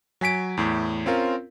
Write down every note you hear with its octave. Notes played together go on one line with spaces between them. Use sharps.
F#3 G#5 B6 D7
E2 A2
C4 C#4 F4 A#4